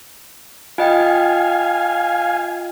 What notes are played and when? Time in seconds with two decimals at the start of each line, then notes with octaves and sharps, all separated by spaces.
0.78 F4 D#5 F5 G5 G#5